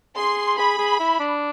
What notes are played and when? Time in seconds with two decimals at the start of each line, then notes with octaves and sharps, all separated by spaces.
0.16 G#4 C6
0.58 G#4 B5
0.78 G#4
1.00 E4
1.20 D4